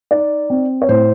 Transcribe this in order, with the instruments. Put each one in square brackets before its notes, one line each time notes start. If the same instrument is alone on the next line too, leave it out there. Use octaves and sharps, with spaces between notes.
[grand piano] D#4 D5
C4
C#5
A2 C5